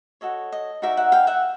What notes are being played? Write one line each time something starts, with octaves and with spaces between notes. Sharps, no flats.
F#4 A4 C#5 D#5
D#5
D#4 F#4 A#4 D5 E5
E5 F#5
F5 G5
E5 F#5